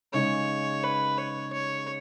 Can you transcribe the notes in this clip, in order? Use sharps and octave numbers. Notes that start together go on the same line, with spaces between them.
C#3 G#3 D#4 C#5
B4
C#5
C#5